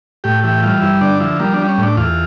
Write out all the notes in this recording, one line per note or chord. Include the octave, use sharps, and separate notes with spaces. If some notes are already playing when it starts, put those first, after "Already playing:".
A2 G4
E3 G4
G3 F4
G2 E4
D3 D4
F3 E4
G3 A#3
D4
G3
C#4
A2
D4
E2 F4